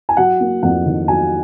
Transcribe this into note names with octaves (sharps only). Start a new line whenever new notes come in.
G#5
F#3 F#5
A#3
F2 F#5
D#3
F#3 G#5